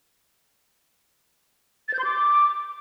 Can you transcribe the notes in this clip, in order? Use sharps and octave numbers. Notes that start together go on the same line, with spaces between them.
A6
G6
C6
D6